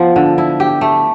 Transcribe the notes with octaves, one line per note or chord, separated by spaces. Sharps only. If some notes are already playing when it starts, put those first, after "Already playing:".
Already playing: F3 B3 F4
D3
E4
G4
A3